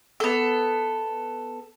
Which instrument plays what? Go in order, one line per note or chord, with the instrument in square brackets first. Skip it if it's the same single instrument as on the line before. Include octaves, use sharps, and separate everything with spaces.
[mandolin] B3 A4